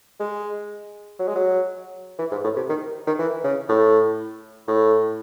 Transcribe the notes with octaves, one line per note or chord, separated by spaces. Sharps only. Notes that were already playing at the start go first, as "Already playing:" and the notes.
G#3
F#3
G#3
F#3
E3
G#2
A2
C3
D#3
D#3
E3
C#3
A2
A2